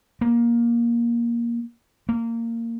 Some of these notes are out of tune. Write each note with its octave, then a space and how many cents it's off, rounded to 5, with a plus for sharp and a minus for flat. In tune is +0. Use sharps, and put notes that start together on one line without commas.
A#3 +15
A#3 -20